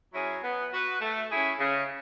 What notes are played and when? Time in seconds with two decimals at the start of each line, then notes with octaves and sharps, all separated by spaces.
0.13 F#3 C#4 E4 G#4
0.43 B3
0.72 F#4 B4
1.01 A3
1.30 C#4 E4 G#4
1.59 C#3